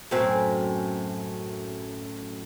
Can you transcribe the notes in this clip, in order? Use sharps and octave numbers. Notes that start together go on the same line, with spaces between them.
F#2 A2 C4